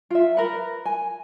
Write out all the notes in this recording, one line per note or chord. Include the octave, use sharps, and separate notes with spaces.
F4 E5
A#4 B4
G#5